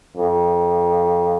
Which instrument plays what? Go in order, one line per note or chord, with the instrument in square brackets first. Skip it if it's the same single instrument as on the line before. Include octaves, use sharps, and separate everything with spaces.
[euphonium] F2